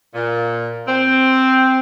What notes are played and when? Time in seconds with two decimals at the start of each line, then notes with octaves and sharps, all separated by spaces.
0.14 A#2
0.88 C4